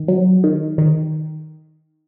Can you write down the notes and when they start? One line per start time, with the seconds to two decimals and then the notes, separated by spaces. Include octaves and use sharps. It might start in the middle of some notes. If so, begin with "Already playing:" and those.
Already playing: D#3
0.08 F#3
0.44 D#3
0.78 D#3